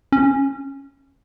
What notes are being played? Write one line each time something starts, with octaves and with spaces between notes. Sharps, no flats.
C#4